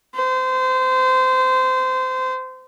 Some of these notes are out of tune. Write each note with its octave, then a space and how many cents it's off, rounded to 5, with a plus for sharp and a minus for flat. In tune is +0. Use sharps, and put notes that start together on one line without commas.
C5 -25